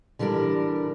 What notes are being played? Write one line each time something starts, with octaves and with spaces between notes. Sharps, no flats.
D3 E3 G3 D4 A#4